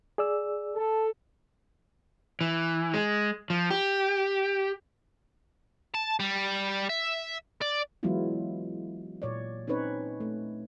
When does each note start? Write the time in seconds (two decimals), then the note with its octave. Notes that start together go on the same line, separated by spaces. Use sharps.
0.18 G#4 D5 E6
0.76 A4
2.41 E3
2.94 G#3
3.50 F3
3.71 G4
5.94 A5
6.20 G3
6.90 E5
7.61 D5
8.03 E3 F#3 G#3 B3 E4 F4
9.22 A#2 C#5 D5
9.67 C4 C#4 D#4 B4 C#5
10.20 A3